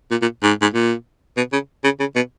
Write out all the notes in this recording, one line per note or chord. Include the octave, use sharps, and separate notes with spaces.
A#2
A#2
G#2
G#2
A#2
B2
C#3
C#3
C#3
B2